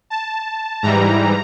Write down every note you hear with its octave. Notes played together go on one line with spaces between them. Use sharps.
A5
G#2 E3 G3 A#5